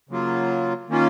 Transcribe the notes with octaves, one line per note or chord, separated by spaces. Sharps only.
C#3 F#3 A#3 F4
D#3 A#3 C#4 F4